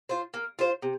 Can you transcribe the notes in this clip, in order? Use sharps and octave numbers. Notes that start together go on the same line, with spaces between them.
F4 C5
A#3
F4 C5
C3